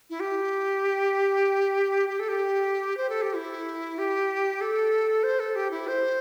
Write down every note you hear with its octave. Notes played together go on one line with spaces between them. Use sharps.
E4
G4
G4
A4
G4
C5
A4
G4
E4
G4
A4
C5
A4
G4
E4
C5